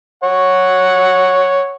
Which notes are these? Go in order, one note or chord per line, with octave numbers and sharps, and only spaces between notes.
C#5 F#5